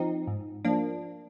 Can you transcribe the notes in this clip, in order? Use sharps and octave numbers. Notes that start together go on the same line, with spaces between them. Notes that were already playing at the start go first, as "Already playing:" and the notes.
Already playing: F3 C4 D#4
G#2
F3 A#3 D4